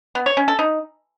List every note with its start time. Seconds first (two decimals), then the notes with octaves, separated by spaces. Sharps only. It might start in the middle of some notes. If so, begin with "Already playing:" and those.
0.15 B3
0.26 C#5
0.37 C#4
0.48 A4
0.59 D#4